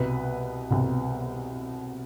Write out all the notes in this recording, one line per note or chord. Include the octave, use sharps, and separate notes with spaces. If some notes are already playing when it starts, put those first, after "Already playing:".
Already playing: C2 B2 B4
C2 B2